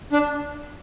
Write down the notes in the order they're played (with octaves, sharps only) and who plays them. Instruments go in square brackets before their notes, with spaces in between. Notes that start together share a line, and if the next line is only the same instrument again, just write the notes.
[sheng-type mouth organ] D4